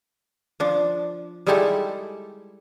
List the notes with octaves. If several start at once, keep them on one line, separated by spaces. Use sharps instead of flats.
F3 D4
G3 G#3 D#4 E4 G4 A4